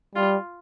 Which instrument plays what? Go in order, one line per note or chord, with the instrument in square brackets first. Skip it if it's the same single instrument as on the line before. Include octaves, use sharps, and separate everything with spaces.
[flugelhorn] G3 [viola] F4